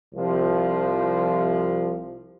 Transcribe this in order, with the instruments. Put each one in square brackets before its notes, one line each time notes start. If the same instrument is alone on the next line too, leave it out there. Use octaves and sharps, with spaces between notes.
[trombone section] C2 C3 F3